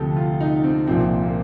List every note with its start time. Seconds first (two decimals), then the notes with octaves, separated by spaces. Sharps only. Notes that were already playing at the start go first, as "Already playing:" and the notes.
Already playing: D2 C3 F3 G4 A4
0.16 F4
0.40 D#4
0.64 C4
0.87 C2 A#2 F3 C4
1.23 A#3